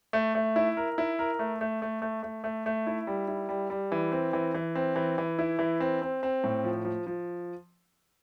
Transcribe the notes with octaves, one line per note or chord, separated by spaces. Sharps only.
A3
A3
E4
A#4
E4
A#4
A3
A3
A3
A3
A3
A3
A3
E4
G3
E4
G3
G3
E3
C4
E3
E3
C4
E3
E3
E4
E3
C4
C4
C4
A2
F3
F3
F3